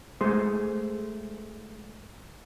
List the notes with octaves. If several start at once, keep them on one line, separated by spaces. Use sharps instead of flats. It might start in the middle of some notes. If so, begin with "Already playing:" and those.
G#3 A3 G#4 C5